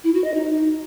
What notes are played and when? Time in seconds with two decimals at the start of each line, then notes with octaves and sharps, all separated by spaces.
0.04 E4
0.14 F#4
0.24 D#5
0.34 D#4